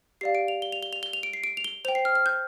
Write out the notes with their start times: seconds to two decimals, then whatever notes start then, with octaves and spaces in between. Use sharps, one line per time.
0.21 G4 D5 F5 C7
0.35 D7
0.48 F7
0.62 G7
0.72 F7
0.83 G7
0.93 F7
1.03 G7
1.13 F7
1.23 D7
1.33 C7
1.44 D7
1.57 F7
1.64 G7
1.85 C5 F7
1.88 G5
1.95 C7
2.05 F6
2.15 F6
2.26 G6